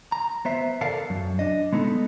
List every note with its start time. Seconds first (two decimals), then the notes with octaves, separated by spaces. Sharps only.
0.12 A#5
0.45 B3 C5 E5
0.81 A4 A#4 D5 F5 F#5 A5
1.10 F#2
1.39 D4 D#5
1.73 G#3 B3 D#4 A4